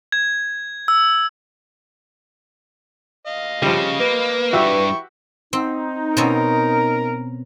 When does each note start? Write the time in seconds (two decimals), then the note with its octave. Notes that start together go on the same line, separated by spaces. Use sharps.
0.12 G#6
0.88 E6
3.27 D#5 F5
3.62 C#3 F3 G3
4.00 A#3 B4
4.53 E2 G2 E4 F#4 G4 E5 G5 C#6
5.53 C4 D#4
6.17 B2 C4 C#4 A#4